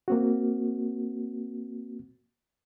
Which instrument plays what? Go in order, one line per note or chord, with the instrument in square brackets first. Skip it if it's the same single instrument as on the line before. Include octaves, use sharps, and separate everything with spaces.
[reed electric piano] A#3 C4 F#4